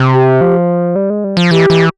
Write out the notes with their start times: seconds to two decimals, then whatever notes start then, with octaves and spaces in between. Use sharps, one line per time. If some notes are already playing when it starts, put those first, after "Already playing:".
Already playing: C3
0.13 G4
0.41 F3
0.95 G3
1.10 G#3
1.24 G3
1.37 F3
1.51 E3 G4
1.70 E3